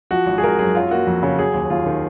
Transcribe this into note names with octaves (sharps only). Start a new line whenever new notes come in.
F3 F#4
G#1
G#4
G#1 A#4
F#2 G#4
F#3 F4
A#3 F#4
F2
C#3
F#3 G#4
D#2
D#2 F4
D#3